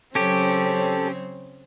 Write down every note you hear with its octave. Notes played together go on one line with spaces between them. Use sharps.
C#3 F#3 C4 C#4 G4 A4 C#5